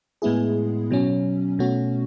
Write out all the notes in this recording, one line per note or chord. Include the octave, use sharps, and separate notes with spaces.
A2 G#3 B3 E4 G#4
B2 F#3 C#4
B2 A3 C#4 F#4